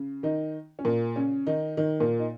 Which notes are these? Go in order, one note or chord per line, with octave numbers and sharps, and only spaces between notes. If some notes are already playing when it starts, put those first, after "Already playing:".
Already playing: C#3
D#3 D#4
C#4
A#2 A#3
C#3 C#4
D#3 D#4
D#3 D#4
A#2 A#3
D#4